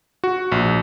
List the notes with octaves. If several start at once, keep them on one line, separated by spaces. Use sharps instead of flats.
F#4
A#1